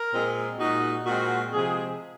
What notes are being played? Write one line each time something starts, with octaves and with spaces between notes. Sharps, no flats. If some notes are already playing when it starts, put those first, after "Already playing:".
Already playing: A#4
A#2 G#3 C4
A#2 G#3 D#4 F#4
A#2 G#3 C4 F#4
C3 F3 G#3 G#4